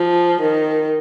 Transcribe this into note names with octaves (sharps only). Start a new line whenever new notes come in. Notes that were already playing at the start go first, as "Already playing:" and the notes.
Already playing: F3
D#3